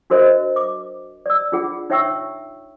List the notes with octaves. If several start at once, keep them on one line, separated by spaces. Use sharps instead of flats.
D4 F#4 A#4 C5 D#5 E5
D6
D5 E6
D4 F4 G#4 F#5
D#4 C#5 E5 G5 C#6 E6